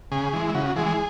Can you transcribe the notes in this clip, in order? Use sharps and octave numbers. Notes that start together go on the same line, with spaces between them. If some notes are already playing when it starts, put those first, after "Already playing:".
C#3 G#4
E3 G#3
E4
C#3 F#4
F#4
E3 G#3 G#4
G#4